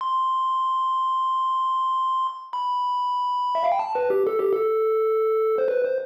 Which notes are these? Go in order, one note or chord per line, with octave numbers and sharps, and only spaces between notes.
C6
B5
E5
F5
G5
A5
B4
G4
A4
G4
A4
C5
B4
C5